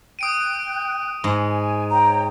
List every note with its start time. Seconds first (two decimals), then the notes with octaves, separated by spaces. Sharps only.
0.19 G5 D#6 F#6 D7 D#7
1.24 G#2 G#5
1.90 C#5 G5 A#5